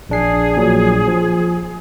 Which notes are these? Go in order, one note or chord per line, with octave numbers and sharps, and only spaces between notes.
A#1 D4 G#4 C7
A#1 A#2 F#3
F3